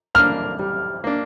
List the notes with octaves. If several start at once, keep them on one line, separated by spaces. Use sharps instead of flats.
A#3 D4 F6
G3
A#3 D4